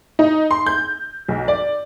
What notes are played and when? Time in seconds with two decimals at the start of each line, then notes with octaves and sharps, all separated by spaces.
0.19 D#4
0.51 C6
0.66 G6
1.28 B1
1.48 D5